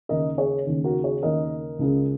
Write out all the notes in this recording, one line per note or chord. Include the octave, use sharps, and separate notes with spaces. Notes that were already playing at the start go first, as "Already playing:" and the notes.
D#2 C#3 A#4 D#5
G#4 C#5
D#2 C#3
F#4 A#4
G#4 C#5
D#2 C#3 A#4 D#5
C#2 C#3